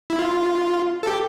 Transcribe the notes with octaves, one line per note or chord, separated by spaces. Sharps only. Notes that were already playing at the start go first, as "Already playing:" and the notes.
E4
F4
A4
G4